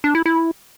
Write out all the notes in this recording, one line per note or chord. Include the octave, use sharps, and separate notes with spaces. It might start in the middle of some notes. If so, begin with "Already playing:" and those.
D4
E4
E4